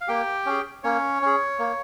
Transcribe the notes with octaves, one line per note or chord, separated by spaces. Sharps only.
F5
A#3 G4 G5
C#4 G#4
A#3 C#4 C#5
C#4 G#4
A#3